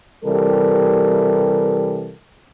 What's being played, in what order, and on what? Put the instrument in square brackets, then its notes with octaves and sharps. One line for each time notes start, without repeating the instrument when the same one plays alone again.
[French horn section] C3 E3 G3 A4 A#4